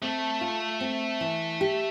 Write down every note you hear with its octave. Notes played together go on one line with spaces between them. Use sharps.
A3 C4
F4
C4
E3
G4